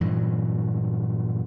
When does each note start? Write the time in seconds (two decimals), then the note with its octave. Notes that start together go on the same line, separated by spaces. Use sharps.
0.01 G2 A#2 E3 F#3